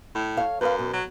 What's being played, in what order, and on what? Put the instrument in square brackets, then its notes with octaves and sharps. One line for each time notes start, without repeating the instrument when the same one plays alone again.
[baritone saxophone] A2
[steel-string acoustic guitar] A4 C#5 F5
[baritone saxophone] F#2 [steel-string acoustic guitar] B4 D#5 F5
[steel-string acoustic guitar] B2
[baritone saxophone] F#3